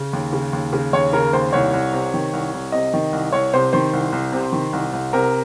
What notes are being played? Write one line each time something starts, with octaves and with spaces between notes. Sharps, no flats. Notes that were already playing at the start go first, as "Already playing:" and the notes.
Already playing: C#3
D#2
C#3
D#2
C#3
D#2 C#5
C#3 A#4
D#2 C5
C2 C#5
C2
C3
D#3
C2
C2
C3 D#5
D#3
C2
C2 C#5
C3 C5
D#3 C5
C2
C2
C3
D#3
C2
C2
C3 A#4